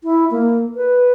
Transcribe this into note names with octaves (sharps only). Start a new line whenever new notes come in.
E4
A#3
B4